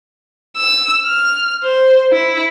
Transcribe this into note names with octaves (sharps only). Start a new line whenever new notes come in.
E6
F6
C5
E4